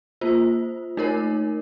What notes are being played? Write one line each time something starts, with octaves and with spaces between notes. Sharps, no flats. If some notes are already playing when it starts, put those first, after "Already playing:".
A#3 F4 C5
A3 D#4 A#4 C#5